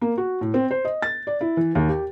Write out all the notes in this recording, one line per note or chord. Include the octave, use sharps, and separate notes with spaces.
A#3
F#4
A2
C4
C5
D#5
A6
D5
E4
E3
D#2
G4